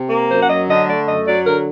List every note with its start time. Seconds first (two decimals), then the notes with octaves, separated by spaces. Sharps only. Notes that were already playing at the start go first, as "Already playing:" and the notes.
Already playing: C3
0.10 A#3
0.29 F#2 C5
0.40 F#5
0.48 F#3 D#5
0.67 D3 D#5
0.87 A3 D5
1.06 F#2 D#5
1.26 F#3 D5
1.45 D3 A#4